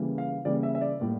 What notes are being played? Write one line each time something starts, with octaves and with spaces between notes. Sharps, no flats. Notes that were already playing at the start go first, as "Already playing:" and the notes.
Already playing: C#3 E3 G3 A#3
F5
C#3 E3 G3 A#3 D5
E5
E5
D5
A2 G3 A#3